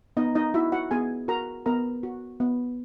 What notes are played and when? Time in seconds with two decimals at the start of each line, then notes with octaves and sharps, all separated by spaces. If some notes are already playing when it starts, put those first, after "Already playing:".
0.17 B3 D#4 D#5
0.35 D#4 D#5
0.54 E4 F#4 E5
0.72 F#4 F#5
0.91 B3 G#4 G#5
1.28 F#4 A#4 A#5
1.66 B3 A#4 A#5
2.03 F#4
2.40 B3